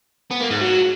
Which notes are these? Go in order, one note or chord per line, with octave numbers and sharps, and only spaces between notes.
B3
A#3
G#2
F#3